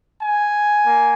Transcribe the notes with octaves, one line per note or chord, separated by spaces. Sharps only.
G#5
A#3